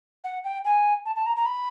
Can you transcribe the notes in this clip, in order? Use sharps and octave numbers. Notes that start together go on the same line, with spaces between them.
F#5
G5
G#5
A5
A5
A#5
A#5
B5